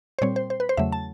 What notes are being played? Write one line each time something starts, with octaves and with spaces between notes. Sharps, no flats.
C5
A#2 G3 C4 C#5
C5
C5
B4
C5
E2 C#3 F#3 A3 E5
A5